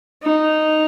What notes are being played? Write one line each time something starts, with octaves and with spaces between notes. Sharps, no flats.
D#4